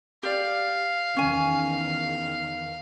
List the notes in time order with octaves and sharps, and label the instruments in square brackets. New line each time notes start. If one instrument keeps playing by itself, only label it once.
[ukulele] G4 D5 [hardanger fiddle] F5
[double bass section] E2 D#3 [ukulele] C#4 G#5